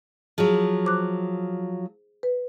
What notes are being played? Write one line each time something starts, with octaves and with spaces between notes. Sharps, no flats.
F3 F#3 G#4
C5 D6 F#6
B4